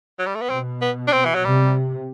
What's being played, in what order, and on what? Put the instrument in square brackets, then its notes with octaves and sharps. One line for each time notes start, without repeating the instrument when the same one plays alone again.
[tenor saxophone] F#3
G3
A3
B3
[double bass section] B2 [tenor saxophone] C4
[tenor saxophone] B3
D4
C4
E3
F#3
[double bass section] C3 [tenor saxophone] G3